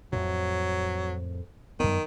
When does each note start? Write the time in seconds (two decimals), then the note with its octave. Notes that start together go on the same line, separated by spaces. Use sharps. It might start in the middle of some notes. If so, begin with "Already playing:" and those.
0.13 F2 A2 F#3
1.80 F#2 D#3 B3